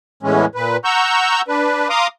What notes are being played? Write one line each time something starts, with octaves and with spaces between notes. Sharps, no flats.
E2 A2 E3 G#3 C#4
A#2 B4
F#5 A#5 C#6 E6 G6
D4 B4
F5 A#5 C6 D6 D#6